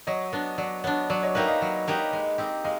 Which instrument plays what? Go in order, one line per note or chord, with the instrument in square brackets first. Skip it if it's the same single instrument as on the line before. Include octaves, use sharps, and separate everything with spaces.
[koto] F#3 [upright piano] C#5 D#5
[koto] B3 D4
[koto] F#3 [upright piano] D5
[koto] B3 D4 [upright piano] C#5
[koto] F#3 [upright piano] D5
[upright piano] C#5 D#5
[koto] A#3 D#4 G4 B4 [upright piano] D5 E5
[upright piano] D#5 F5
[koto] F#3
A#3 D#4 G4 B4
G#3
C4 D#4 G4
[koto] G#3 [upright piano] D#5 F5